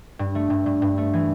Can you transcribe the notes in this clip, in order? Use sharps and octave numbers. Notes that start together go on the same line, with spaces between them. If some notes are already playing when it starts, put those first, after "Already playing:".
G2
A3
G2
G2
G2
A3
E3